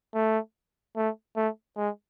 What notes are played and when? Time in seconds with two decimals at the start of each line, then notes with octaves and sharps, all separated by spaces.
0.14 A3
0.96 A3
1.36 A3
1.77 G#3